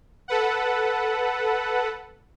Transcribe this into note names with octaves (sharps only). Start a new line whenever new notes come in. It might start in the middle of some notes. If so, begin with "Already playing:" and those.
A4 B4 F#5